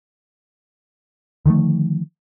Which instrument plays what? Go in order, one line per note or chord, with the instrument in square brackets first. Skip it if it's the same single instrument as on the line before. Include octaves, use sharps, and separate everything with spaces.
[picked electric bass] D3 D#3 F3 A3